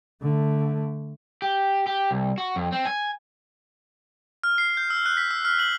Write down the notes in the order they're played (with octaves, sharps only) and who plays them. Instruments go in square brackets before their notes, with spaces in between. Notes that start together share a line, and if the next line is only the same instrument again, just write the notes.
[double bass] D3 A3
[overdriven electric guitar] G4
G4
C2
F#4
F2
C4
G#5
[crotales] F6
C7
G6
E6
F#6
B6
E6
F6
F#7